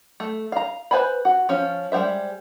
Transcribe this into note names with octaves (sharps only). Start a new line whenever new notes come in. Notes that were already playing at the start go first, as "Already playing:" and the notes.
A3
F5 A#5
B4 C5 F5 G#5 B5
F#4
F3 C#4
G3 G#3 F4 C5 E5